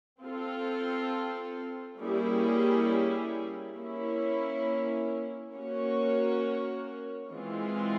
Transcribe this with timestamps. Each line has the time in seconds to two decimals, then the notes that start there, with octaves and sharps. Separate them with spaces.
0.22 C4 F4 A4
1.99 G3 A#3 C#4 E4 G#4
3.76 A#3 C#4 E4
5.53 A#3 C#4 F#4 A#4 C#5
7.30 E3 G#3 C4 F4